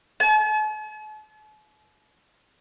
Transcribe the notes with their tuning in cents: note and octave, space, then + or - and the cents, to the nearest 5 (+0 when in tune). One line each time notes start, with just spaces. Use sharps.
A5 -45